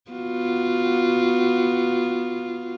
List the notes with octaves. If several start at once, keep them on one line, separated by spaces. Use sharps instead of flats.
B3 F4 F#4